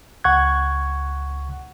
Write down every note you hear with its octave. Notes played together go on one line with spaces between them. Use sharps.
C#2 F#5 C#6 F#6 G#6